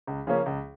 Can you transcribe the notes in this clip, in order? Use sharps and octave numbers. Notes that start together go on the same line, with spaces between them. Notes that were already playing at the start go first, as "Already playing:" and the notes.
C#2
C#3 F3 A#3 C#4
C#2